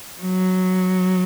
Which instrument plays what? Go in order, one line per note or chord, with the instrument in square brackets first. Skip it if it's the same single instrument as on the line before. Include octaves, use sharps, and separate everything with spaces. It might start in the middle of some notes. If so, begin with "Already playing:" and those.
[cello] F#3